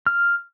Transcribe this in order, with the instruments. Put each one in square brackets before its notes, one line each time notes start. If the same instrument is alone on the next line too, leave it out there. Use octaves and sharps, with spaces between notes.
[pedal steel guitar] F6